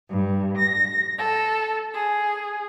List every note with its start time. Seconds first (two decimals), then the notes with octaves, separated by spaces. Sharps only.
0.10 G2
0.57 A#6
1.18 A4
1.93 G#4